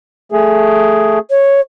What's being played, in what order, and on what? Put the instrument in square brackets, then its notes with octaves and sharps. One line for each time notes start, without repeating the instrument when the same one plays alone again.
[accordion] A3 G#4
[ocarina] C#5